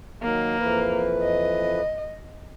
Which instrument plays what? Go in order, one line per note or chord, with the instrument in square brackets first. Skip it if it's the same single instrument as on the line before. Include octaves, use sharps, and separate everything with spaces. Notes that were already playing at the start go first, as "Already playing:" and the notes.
[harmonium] D#3 F#3 [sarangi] A#3
[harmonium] F2 E3 B4
[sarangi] D#5